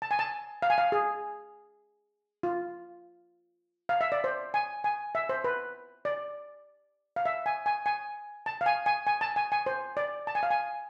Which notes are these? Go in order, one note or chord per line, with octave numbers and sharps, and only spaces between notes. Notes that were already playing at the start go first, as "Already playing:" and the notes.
A5
G#5
A5
F5
G#5
F5
G#4
F4
F5
E5
D5
C5
G#5
G#5
E5
C5
B4
D5
F5
E5
G#5
G#5
G#5
A5
F5
G#5
G#5
G#5
A5
G#5
G#5
C5
D5
A5
G#5
F5
G#5